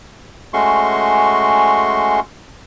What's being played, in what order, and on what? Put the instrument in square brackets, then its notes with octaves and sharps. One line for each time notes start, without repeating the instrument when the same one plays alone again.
[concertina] G#3 A3 C#4 F#4 C6 C#6